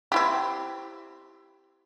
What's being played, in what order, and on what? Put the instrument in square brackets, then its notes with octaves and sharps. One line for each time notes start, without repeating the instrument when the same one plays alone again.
[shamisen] C4 E4 G4